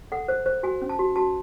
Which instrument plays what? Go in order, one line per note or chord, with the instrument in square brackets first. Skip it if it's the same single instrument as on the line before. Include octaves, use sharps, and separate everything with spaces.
[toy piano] A4 F#5
C5
C5
F#4 G#5
C#4
A5
F#4
F#4 A5